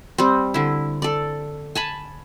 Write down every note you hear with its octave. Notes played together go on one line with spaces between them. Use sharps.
G3 C4
D3 E4
A4 D5
G#5 A5 B5